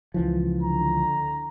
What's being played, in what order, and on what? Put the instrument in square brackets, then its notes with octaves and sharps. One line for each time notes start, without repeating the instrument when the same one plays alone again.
[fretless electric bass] C#2 E3 F3
[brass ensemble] D3 A#5